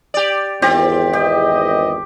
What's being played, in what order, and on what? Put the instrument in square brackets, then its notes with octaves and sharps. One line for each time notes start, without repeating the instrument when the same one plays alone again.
[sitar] G4 D5
[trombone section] G#1 E2 [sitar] C4 [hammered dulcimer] G4
[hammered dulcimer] G4 [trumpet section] D#5